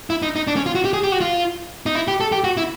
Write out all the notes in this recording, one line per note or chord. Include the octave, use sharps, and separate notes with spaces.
E4
D#4
D#4
D4
C#4
F4
F#4
G4
G#4
G4
F#4
F4
D#4
E4
G4
A4
G4
F#4
E4